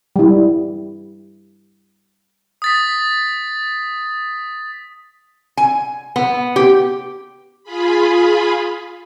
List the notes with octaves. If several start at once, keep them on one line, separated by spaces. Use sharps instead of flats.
G3 E4
D#6 A6 B6
G#5
B3
G4
F4 G#4 B5